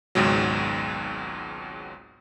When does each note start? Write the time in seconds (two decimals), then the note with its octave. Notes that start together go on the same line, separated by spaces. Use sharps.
0.15 G#1 C#2 G#2 B2 F#3